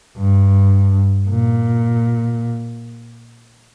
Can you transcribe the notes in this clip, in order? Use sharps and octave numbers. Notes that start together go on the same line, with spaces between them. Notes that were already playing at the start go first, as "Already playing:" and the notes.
G2
A#2